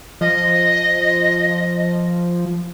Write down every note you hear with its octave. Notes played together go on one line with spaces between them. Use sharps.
F3 D#5